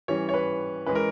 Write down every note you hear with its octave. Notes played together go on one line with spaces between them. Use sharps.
E3 G3 C#4 C#5
C#5
B4
E3 G#3 C#4 B4
A#4